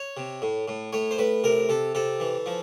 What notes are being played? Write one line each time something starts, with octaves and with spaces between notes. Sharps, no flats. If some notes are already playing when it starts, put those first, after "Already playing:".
Already playing: C#5
C3
A2
A2
A2 C#5
C5
A2 B4
C3 A#4
C3 A4
C3 A4
E3
F3